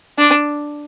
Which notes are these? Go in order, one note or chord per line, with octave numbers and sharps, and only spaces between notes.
D4